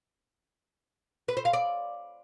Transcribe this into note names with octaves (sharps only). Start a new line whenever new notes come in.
B4
C5
F5
D5